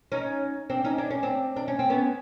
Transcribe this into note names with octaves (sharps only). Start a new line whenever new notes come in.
C#4 D#4
C4 D4
C#4 D#4
D4
C#4
C4 D4
D4
C#4
C4
B3 C#4